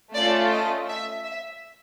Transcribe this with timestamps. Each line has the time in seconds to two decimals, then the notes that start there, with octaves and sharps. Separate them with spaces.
0.14 A3 C#4 F4 A4 D5
0.51 D#5
0.88 E5
1.23 E5